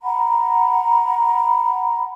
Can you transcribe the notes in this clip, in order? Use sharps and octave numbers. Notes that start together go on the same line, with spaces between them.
F#5 A#5 B5